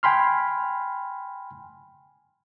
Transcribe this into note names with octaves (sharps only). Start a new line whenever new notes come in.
G5 G#5 B5 C6 F6